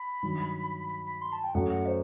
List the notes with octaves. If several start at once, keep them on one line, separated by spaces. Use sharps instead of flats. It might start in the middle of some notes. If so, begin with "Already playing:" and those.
Already playing: B5
G2 D#3 F#3
B5
B5
C6
A5
G5
F#2 F#3 A3 F#5
F#5
C5